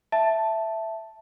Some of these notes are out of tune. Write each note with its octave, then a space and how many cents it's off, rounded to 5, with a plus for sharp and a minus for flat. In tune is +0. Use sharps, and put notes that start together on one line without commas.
E5 +0 A5 +0